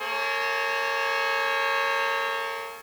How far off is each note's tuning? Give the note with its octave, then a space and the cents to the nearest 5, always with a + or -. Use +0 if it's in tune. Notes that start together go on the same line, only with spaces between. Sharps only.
A#3 -30 G#4 +40 C#5 -10